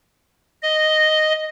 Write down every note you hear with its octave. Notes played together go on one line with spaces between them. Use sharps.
D#5